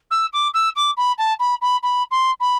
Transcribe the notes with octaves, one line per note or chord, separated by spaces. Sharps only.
E6
D6
E6
D6
B5
A5
B5
B5
B5
C6
B5